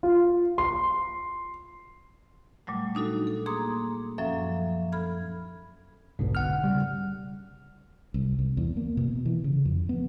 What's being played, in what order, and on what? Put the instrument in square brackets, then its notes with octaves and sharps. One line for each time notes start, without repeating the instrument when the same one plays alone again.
[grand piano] F4
C6
[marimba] A#2 F#3 G3 A3
D4 D#4 F#4 A4
A4
A#3 G#4 A#5 C6 D6 D#6
F#2 F3 F#3 C#4 A4 E5
A4 B5 F6 G#6
[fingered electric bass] F1 B2 D3 [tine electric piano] B1 G#2
[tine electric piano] F#5 F6
[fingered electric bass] C#3 G3
C2
C2
E2
A#3
B2
E3
C#3
F2
B3